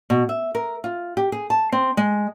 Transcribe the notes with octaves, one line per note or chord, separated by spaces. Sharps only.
B2
E5
A#4
F4
G4
G#4
A5
C4
G#3